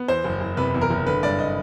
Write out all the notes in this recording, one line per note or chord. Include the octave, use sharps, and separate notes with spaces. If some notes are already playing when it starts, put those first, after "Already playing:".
Already playing: B3
E2 C5
F#1
F#1
C3 B4
E2
A#4
F#1
D3 B4
G2 D5
D#5